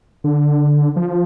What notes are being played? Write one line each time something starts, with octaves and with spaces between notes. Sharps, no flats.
D3
F3